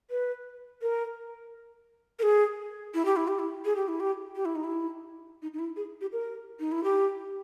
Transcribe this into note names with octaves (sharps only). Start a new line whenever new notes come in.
B4
A#4
A#4
G#4
E4
G4
E4
G4
E4
G#4
G4
E4
G4
G4
E4
D#4
E4
D#4
D#4
E4
G#4
G4
A#4
D#4
E4
G4